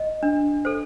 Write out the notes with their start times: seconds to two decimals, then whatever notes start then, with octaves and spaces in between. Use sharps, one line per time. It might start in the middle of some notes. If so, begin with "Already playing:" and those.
Already playing: D#5
0.23 D4
0.65 A4 C5